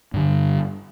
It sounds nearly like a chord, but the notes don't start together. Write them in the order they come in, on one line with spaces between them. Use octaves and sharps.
G2 D3 G3